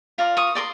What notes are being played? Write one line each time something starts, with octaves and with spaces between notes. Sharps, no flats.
F4 A#4 D5
C#6 D#6
A#4 D5 C6 D6